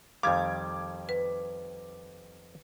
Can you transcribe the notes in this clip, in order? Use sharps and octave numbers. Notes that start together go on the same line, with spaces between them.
F2 D#3 G3 F5 D6 G#6
B4